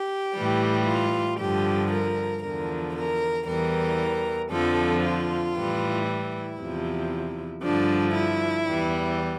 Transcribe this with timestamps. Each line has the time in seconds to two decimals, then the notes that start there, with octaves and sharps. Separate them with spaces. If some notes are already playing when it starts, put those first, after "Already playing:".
Already playing: G4
0.35 A2 E3 G3
0.86 F4
1.39 G2 D3 F3 G4
1.91 A#4
2.43 E2 D3 F3 A#4
2.95 A#4
3.47 E2 E3 G3 A#4
4.51 F2 D3 F3 A4
5.03 F4
5.55 A2 E3 G3
6.07 E4
6.59 E2 C3 F3
7.63 G2 D3 F3 D4
8.14 E4
8.68 E2 E3 G3